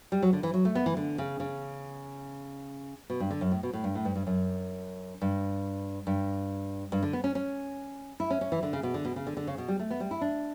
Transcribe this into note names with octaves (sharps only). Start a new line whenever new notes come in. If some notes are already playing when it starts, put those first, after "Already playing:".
G3
F#3
D3
E3
F#3
A3
B3
E3
D3
C#3
C#3
B2
G2
D3
F#2
A2
B2
A2
G2
A2
G2
G2
F#2
G2
G2
G2
D3
B3
C#4
C#4
E4
C#4
C#4
E3
D3
C#3
B2
D3
B2
C#3
D3
D3
C#3
B2
G3
A3
B3
G3
E4
D4